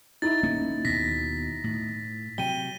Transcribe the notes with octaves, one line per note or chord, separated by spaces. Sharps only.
D#4 E4 A6
D1 A#3 C#4
D#2 B2 A#6 B6
A2
C3 F#3 G5 D#7 G7